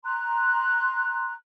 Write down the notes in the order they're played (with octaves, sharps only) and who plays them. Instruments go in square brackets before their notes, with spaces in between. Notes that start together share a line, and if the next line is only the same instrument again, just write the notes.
[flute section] A#5 C6 F#6